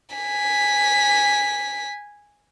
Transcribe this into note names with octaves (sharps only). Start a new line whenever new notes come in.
G#5 B6